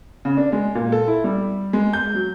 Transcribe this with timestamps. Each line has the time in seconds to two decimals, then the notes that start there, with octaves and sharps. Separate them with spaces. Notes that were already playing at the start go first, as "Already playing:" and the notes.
0.25 C#3
0.37 D4
0.52 G#3
0.75 A#2
0.92 A4
1.07 E4
1.24 G3
1.73 G#3
1.93 G6
2.14 F#3